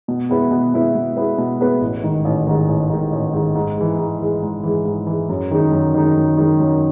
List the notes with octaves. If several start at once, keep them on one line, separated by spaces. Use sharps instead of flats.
B2
G#3 B3 E4 B4
B2
G#3 B3 E4 B4
B2
G#3 B3 E4 B4
B2
G#3 B3 E4 B4
A1
G#2 D#3
A1
G#2 D#3
A1
G#2 D#3
A1
G#2 D#3
G#2
E3 G#3
G#2
E3 G#3
G#2
E3 G#3
G#2
E3 G#3
F#2
D#3 G#3 D#4
F#2
D#3 G#3 D#4
F#2
D#3 G#3 D#4
F#2